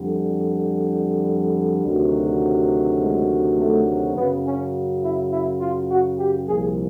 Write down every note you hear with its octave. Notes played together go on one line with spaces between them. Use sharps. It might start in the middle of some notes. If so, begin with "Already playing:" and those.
Already playing: F2 D3 G3
D2 C3 D#3 F#3
G#3
A3
F#2 C#3 F#3 B3
C#4
E4
E4
F4
F#4
G4
C2 A#2 F3 G#4